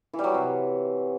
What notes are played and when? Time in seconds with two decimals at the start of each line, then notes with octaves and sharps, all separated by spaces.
0.14 E3
0.19 G3
0.24 F#3
0.29 E3
0.34 C3